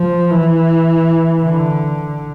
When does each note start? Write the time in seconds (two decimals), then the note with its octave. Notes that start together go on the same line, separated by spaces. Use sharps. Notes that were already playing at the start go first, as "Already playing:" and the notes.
Already playing: F3
0.31 E3
1.43 D3